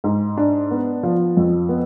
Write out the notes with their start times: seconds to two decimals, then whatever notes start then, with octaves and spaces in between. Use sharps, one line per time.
0.04 G#2
0.37 D4
0.71 B3
1.03 F3
1.37 F2
1.69 B3